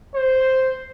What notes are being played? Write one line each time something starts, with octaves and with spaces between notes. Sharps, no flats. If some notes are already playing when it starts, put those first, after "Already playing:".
C5